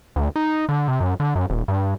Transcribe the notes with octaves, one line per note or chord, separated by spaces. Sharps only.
D2
D#4
D3
C3
F#2
D3
F#2
D#1
G2